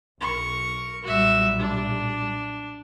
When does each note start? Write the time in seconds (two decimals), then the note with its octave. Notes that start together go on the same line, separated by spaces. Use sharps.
0.21 B1 A#4 C#6
1.04 B1 A#2 G3 F#4 E5
1.59 D4